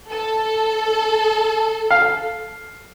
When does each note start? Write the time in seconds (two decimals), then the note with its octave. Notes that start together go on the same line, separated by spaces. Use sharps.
0.11 A4
1.91 F5